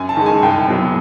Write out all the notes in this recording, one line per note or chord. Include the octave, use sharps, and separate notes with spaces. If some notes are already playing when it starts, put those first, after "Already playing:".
Already playing: F#2 G#5
A5
D#3 G#3
G#5
C2 G5
B2 F#3 B3